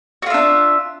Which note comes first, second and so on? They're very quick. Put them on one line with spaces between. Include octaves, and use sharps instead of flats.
F#4 F4 E5 D4